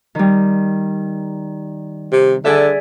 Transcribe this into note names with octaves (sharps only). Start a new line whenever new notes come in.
D#3 G3
C3
D3 G#4 D5 E5